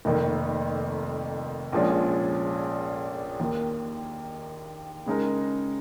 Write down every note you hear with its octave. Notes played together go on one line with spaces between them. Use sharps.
F1 F2 D#3 A#3
A#1 A#2 F3 G#3 C#4
D#2 D#3 A#3
C#3 G#3 D#4 A#4